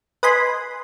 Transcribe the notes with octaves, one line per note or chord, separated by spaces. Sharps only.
B4 D#5 G#5 B5 C6